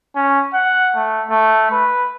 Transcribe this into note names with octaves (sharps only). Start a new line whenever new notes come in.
C#4
F#5
A3
A3
B4